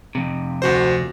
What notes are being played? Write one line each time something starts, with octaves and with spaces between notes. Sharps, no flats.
F2 C3
D2 F#4 C5